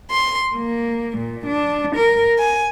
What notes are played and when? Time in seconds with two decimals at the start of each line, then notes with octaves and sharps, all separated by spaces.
0.12 C6
0.55 A#3
1.18 A#2
1.47 D4
1.97 A#4
2.38 G#5